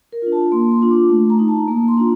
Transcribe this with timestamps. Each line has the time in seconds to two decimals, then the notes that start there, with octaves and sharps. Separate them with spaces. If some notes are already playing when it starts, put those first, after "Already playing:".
0.12 A#4
0.22 D4 F4
0.32 A5
0.52 A#3 C6
0.71 C6
0.81 D4 F4
0.91 D6
1.10 A3
1.30 A#5
1.39 D#4
1.48 A5
1.68 A#3 A#5
1.88 C6
1.98 D4 F4